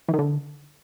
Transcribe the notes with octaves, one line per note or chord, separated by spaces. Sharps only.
E3
D#3
D3